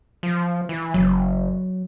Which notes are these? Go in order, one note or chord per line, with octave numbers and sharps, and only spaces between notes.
F3
E3
F#1 F#3